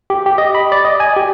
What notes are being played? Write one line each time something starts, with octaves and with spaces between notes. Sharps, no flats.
G4
G4
D#5
B5
D5
D#5
G#5
G4